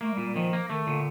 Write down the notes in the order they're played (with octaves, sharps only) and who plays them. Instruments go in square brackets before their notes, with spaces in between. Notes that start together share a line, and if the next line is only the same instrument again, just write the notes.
[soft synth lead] A3 [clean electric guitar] A#3
[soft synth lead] G3
[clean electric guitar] A#2
[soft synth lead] G3
[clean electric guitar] D#3 [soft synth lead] F3
[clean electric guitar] A#3
[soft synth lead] D#3 [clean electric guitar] A3
[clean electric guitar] A#2 [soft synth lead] D3